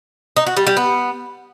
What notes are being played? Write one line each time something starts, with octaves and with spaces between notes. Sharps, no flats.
D#4
F#4
G3
G3
B3